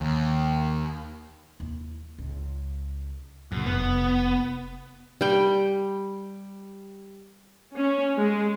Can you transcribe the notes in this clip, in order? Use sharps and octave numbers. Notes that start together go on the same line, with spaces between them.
D#2
D#2 E4
C#2
A#1 F#2 C#3
F1 B3
G3 G5
C#4
G#3